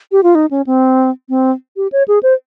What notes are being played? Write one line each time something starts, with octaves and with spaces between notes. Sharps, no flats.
G4
F4
D#4
C#4
C4
C4
G4
C#5
G#4
C5